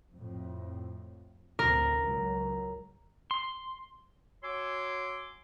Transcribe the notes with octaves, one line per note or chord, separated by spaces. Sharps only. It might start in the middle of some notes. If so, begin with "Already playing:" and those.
F2 A2
A1 D2 C3 A#4
C#2 F#3
C6
F#4 C#5 G#5 C6 D6 E6